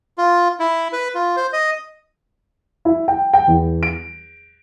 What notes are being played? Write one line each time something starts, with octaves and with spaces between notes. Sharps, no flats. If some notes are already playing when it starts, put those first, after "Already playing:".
F4
E4
B4
F4
C5
D#5
E4
G5
G5
E2
D7